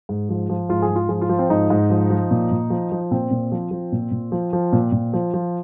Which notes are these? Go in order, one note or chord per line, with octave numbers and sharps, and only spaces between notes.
G#2
F3
F3
G#2 F4
G#4
G#2
F4
F3 G#4
F4
F3
C4
G#2 D#4
G#2
F3
F3
A#2
A#2
F3
F3
A#2 C4
A#2
F3
F3
A#2
A#2
F3
F3
A#2
A#2
F3
F3